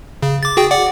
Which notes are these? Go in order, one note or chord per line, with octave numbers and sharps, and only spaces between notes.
C#3
D6 A6
F#4 G#4 G5
D5 F#5 D6